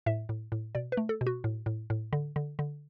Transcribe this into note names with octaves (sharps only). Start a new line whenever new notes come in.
A2 E5
A2
A2
B2 D5
B4
A3
A4
B2
F#4
A2
A2
A2
D3
D3
D3